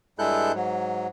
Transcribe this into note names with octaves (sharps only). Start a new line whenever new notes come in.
G2 G#3 E4 A4 F#6 G6
G#2 F#3